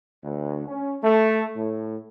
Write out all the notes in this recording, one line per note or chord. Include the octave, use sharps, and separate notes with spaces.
D2
C#4
A3
A2